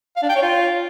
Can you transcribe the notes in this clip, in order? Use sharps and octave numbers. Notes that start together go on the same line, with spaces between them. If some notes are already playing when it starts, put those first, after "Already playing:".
F5
D4
G5
C#5
F4